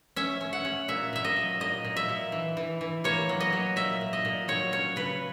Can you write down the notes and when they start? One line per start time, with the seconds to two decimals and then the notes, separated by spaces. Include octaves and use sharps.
0.16 C#4 E5
0.41 C#4
0.53 F#5
0.65 C#4
0.88 A#2 E5
1.13 A#2 E5
1.25 D#5
1.36 F#3
1.60 A#2 D#5
1.84 A#2
1.96 E5
2.09 A#2
2.32 E3
2.57 E3
2.81 E3
3.04 A#3 C#5
3.29 F#3
3.40 D#5
3.53 F#3
3.76 A#2 E5
4.01 A#2
4.13 D#5
4.25 A#2
4.48 F#3 C#5
4.72 C#4 C#5
4.96 C#3 B4